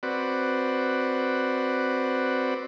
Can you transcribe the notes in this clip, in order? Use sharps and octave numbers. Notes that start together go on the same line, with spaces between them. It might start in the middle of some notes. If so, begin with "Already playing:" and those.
C4 F#4 B4 D5